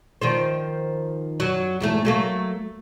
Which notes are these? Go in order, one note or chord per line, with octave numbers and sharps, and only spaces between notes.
D#3 F3 C5
F#2 F#3
E2 G#2 A3
F#3 A3 A#3